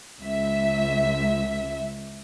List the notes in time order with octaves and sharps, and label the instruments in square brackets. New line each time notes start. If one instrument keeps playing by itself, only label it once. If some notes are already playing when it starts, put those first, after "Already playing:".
[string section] C#2 E5